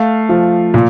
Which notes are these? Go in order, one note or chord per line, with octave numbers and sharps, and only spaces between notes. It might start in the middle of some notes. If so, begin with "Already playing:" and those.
Already playing: A3 F5
F3
A#2